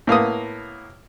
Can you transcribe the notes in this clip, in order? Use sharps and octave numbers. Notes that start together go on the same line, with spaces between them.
A2 A#3 B3 D#6